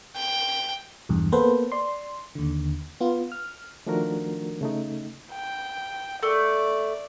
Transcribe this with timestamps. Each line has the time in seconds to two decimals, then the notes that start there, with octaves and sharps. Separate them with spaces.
0.16 G5
1.09 B1 E2 G2
1.32 A#3 B3 A4 B4 C5
1.72 D5 C6
2.35 D#2 D3
3.01 B3 F4
3.32 F6
3.86 D#3 F3 A3 D4 F#4 A#4
4.61 C#3 A3 D#4
5.33 G5
6.23 A3 D5